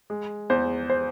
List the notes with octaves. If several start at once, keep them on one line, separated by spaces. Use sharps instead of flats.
G#3
E2 C5
C5